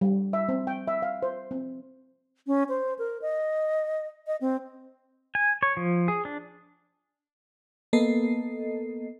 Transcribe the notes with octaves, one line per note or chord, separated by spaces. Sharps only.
G3
E5
C4
G5
E5
F5
C5
C4
C#4
C5
A#4
D#5
D#5
C4
G#5
C#5
F3
G#4
D4
A#3 B3 A4 D#5 C7